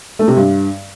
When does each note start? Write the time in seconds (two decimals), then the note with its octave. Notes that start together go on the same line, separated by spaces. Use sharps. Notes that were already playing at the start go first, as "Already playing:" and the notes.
0.19 A3
0.28 C3
0.36 G2